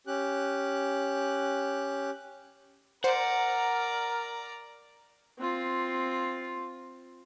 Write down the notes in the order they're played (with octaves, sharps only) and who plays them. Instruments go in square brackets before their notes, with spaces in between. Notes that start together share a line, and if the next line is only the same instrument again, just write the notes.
[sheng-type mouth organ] C#4 G4 F#6
[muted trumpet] A#4 [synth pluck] C5 [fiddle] D5 A#5 [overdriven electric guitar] F#5
[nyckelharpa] C4 F4